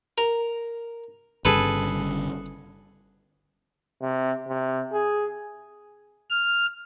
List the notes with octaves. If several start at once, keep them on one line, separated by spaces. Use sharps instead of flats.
A#4
G1 G2 C#3 G#4 A4 B4
C3
C3
G#4
F6